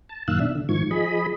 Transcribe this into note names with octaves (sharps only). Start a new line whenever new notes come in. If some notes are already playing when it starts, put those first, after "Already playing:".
A5
F#2 A#2 D#3 F5 E6 F#6
B2 D4 E5
D3
G#2 D#3 F3 C#6 G#6
F3 G#4 D#5 B5